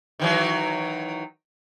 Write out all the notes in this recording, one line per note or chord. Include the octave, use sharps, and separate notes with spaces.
D#3 E3 F#3